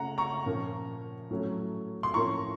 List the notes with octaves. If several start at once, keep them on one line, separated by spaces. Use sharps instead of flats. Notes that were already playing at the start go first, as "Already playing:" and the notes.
Already playing: C#3 A3 C#4 F#5 A#5
A#5 C#6
A#2 F3 A#3 C#4
A2 F#3 A3 C#4
C6
A2 F3 A#3 C#4 A#5 C#6